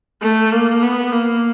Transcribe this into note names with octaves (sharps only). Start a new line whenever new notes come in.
A3
A#3
B3
A#3